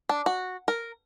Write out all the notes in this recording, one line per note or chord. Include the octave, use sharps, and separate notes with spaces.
D4
F#4
A#4